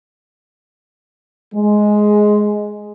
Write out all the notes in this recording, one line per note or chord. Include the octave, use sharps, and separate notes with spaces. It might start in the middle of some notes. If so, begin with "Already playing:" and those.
G#3